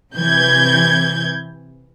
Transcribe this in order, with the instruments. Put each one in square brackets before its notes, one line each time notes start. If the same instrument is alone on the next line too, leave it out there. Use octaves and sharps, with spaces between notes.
[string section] C3 E3 G6 G#6